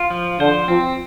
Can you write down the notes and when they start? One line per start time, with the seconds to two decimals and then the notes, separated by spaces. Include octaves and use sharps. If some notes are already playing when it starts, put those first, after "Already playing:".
Already playing: F4
0.11 F3
0.40 D3 C5
0.68 F3 C4